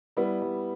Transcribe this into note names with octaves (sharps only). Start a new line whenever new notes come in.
G3 B3 E4
G3